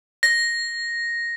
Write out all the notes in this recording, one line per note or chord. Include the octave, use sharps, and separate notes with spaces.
A#6